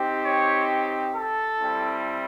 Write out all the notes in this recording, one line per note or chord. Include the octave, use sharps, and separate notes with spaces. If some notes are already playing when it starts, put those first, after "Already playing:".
Already playing: C4 D#4 G4
C#5
A4
G3 C4 E4